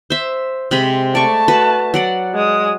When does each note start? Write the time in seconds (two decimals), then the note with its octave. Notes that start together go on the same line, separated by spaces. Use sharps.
0.10 C5 E5
0.71 C3 G#3 B5
1.15 A3 D5 A5 C#6
1.48 F#4 B4
1.94 F#3 D5 F#5
2.35 G#3 D#6